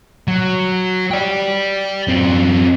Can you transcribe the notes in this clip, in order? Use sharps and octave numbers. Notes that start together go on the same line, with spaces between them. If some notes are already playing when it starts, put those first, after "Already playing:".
F#3
D5 G5
F#2 C4